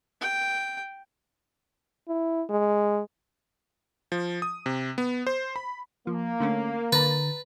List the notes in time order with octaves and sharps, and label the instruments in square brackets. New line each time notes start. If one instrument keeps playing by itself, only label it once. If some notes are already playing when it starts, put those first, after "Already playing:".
[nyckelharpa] G5
[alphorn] E4
G#3
[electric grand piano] F3
D#6
C3
B3
C5
B5
[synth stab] F3 [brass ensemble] A#3
[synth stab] D3 A3 C#4
[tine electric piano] D3 [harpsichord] B4 [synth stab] A#5 A6